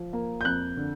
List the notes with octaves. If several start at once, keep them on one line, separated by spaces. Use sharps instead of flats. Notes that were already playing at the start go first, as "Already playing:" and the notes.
Already playing: F3
A#3
G6
F2 F#6
D3